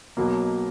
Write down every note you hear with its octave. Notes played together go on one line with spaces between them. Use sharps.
B1 B2 F#3 A#3